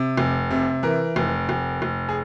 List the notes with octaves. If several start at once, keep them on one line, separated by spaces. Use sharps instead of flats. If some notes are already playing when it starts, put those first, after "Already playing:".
Already playing: C3
F1
C3
E3 A#4
F1
F1
F1
G#4